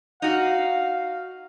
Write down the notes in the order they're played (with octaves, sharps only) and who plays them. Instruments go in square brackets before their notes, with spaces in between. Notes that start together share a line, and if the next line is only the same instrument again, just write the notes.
[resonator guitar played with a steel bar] D#4 F#4 [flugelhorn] F5